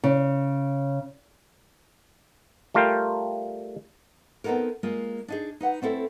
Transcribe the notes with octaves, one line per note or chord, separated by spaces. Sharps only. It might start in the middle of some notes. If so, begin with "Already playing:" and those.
C#3
G3 A3 F4 A#4 F5 G5
B3 C4 D#4 F#4 A4 A#4
G#3 A#3 F4
D4 D#4 G#4
D#4 B4 F#5
A3 C4 E4 A4